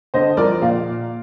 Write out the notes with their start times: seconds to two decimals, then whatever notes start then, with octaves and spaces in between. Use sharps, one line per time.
0.14 D3 C5 D#5
0.37 F3 A#4 D5
0.61 A#2 D5 F5